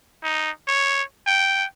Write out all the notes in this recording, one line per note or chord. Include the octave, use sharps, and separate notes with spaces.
D#4
C#5
G5